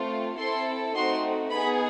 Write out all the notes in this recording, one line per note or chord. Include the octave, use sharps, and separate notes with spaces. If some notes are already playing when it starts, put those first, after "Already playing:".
Already playing: A3 C4 F4
C4 E4 A4 C6
A3 C4 D#4 F#4 C6
B3 D#4 G#4 B5